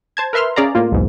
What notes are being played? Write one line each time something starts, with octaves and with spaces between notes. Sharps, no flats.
C5 A5 G#6
A#4 B4 E5 C6 F6
C#4 G#4 D5 F5 A#5
A2 A#3 F4
B1 E2 G#2